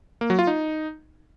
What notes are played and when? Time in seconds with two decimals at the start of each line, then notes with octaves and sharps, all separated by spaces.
0.21 A#3
0.30 F#3
0.39 F4
0.47 D#4